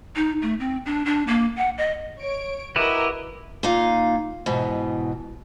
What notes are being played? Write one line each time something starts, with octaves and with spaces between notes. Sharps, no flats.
D#4
A3
C4
D4
D4
A#3
F#5
D#5
C#5 D7
E4 F#4 G4 A#4 B4 D#5
A#2 D#4 F5
G#2 B2 E3